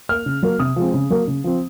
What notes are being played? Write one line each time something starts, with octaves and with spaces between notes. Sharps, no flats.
A#3 F6
C#3
F#3 A#3
C3 D#6
F3 G#3 C4
C#3
F#3 A#3
C#3
F3 C4